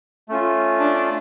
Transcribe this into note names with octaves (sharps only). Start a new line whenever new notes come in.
A3 C#4 F4
D4